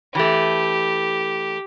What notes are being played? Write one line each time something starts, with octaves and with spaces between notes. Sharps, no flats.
E3 A3 G4